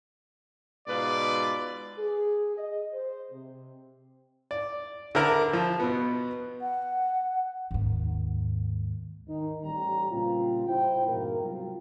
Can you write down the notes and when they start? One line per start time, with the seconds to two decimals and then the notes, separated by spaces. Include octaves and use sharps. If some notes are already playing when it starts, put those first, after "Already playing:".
0.87 G#2 B2 F4 B4 D5
1.98 G#4
2.58 D#5
2.92 C5
3.31 C3
4.51 D5
5.15 D3 E4 A#4
5.53 F3
5.80 B2 B3
6.61 F#5
7.71 D#2 G#2
9.28 D#3 D#4
9.63 A1 G3 A#5
10.11 A#2 C#3 G3 C4 F4
10.68 A2 E4 C5 G5
11.06 F2 G#2 B2 A#3 A#4
11.42 C3 F#3 G3 C4 F4